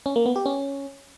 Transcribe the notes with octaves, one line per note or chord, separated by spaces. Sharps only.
C#4
A#3
B3
G4
C#4